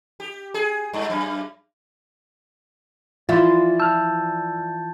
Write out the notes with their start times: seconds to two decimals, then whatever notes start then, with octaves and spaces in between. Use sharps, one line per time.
0.20 G4
0.54 G#4
0.94 G2
1.10 F#2
3.29 E3 F3 E4 F4 D5 E5 C6 A6
3.80 A5 E6 F6 G6